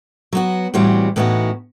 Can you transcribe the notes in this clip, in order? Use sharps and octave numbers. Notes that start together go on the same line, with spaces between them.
F#3 B3 F#4
A2 E3 G3 C4 F#4
A2 E3 B3 D#4 F#4